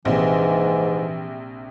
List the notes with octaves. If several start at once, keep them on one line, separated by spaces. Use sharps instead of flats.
A#1 G#2 C3 E3